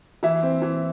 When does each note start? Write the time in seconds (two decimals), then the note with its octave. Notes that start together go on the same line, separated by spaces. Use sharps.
0.23 E3 E4 E5
0.43 C4
0.62 E3